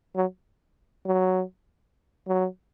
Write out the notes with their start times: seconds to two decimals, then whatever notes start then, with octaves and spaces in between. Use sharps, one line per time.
0.15 F#3
1.06 F#3
2.28 F#3